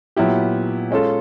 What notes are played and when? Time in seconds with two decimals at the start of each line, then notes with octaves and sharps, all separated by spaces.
0.17 A#2 F#3 B3 E4 G4
0.91 G#3 C#4 F4 A4